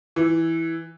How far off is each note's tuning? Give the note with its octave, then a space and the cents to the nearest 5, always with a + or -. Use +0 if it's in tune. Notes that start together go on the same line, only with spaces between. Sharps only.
E3 -5